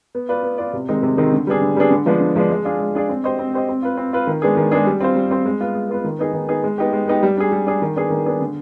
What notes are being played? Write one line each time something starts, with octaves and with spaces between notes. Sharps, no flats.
B3
F4 B4 D5
B3
F4 B4 D5
C3
D#3 G#3 C4 D#4
C3
D#3 G#3 C4 D#4
D3
G3 B3 D4 G#4
D3
G3 B3 D4 G#4
D3
F3 G#3 B3 D4
D3
F3 G#3 B3 D4
G#3
D4 F4 G#4 D5
G#3
D4 F4 G#4 D5
C4
G4 C5 D#5
C4
G4 C5 D#5
C4
F4 B4
C4
F4 B4
D#3
G#3 B3 D4 G#4
D#3
G#3 B3 D4 G#4
G3
C4 F4 C5
G3
C4 F4 C5
G#3
B3 F4 B4
G#3
B3 F4 B4
D#3
B3 D#4 G#4
D#3
B3 D#4 G#4
G#3
B3 D#4 G4
G#3
B3 D#4 G4
G3
D4 G#4
G3
D4 G#4
D#3
B3 D4 G#4
D#3
B3 D4 G#4
D3